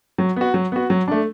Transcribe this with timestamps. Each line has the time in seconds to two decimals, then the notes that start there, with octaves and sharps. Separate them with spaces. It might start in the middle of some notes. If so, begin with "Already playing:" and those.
0.18 F#3
0.36 B3 F#4
0.54 F#3
0.72 B3 F#4
0.90 F#3
1.08 A3 D4